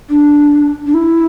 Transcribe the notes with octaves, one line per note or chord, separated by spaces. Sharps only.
D4
D4
E4